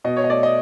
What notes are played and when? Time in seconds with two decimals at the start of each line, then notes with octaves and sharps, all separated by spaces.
0.04 B2 D#5
0.17 C#5
0.24 D#5
0.30 A3 D5
0.43 D#5